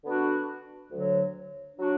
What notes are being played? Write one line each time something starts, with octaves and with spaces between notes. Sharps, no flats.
D3 B3 D4 F#4
D2 D3 F#3
F#3 D4 F#4